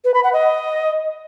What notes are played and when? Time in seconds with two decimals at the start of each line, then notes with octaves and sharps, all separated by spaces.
0.05 B4
0.14 B5
0.24 F#5
0.33 D#5